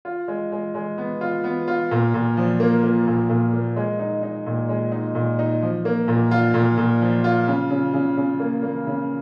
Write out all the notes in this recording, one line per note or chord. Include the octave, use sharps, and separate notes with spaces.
F4
G#3
G#3
G#3
B3
F4
B3
F4
A#2
A#2
F3
A#3
A#3
A#2
A#2
A#3
G#3
D#4
D#4
A#2
G#3
D#4
A#2
D#4
F3
A#3
A#2
F4
A#2
A#2
F3
F4
C#3
C#3
C#3
C#3
A#3
A#3
C#3